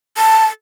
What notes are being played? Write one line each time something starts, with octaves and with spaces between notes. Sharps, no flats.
A5